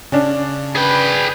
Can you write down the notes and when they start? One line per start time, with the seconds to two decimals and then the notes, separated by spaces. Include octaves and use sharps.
0.12 C#3 C#4 D4
0.75 G#4 B4 G5